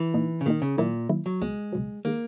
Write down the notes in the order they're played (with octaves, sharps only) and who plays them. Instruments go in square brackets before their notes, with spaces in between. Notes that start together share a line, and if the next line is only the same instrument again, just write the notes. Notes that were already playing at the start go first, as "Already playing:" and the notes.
Already playing: [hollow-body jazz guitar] E3
[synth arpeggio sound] A#2 A#3 D#4
[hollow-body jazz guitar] C#3
[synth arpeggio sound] A#2 A#3 D#4 [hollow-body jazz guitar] D#3
[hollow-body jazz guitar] C#3
[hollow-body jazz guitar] A#2 [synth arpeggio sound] D#3 F#3 A#3 E4
[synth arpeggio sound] D#3 F#3 A#3 E4
[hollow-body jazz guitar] F#3
[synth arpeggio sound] C#2 B2 F#3 [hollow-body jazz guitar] G#3
[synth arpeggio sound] C#2 B2 F#3
[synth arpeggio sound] D#3 G#3 [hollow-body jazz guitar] A#3